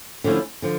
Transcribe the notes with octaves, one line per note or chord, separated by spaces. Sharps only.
D3 F3 A3 C#4 E4
D3 F3